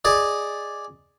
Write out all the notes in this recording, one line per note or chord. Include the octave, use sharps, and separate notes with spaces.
G#4 D5 D#5